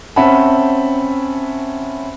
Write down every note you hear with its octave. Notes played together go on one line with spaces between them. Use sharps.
C4 C#4 E5 F#5 A5 B5